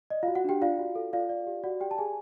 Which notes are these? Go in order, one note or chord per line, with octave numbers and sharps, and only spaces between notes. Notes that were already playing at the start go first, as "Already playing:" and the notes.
D5 D#5
F4 F#4 F5
F#4 F#5
D4 G4 G5
F4 D5 F5
F#4
A4
F4 D5 F5
D5
G4
F#4 D5 F#5
G4 G5
A5
G4 G#4 G#5